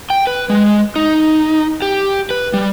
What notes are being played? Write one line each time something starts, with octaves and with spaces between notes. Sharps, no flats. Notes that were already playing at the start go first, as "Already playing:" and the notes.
G5
B4
G#3
D#4
G4
B4
G3